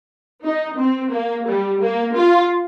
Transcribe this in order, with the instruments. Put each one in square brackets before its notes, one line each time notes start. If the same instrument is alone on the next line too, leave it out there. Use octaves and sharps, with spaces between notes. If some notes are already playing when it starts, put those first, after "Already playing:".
[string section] D#4
C4
A#3
G3
A#3
F4